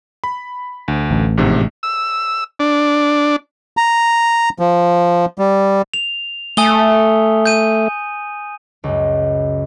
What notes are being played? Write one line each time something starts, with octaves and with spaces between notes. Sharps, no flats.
B5
D2
A1
A#1 G#2 C3
E6
D4
A#5
F3
G3
F7
A3 G#5 D#6 G7
G6 D#7
C#2 F#2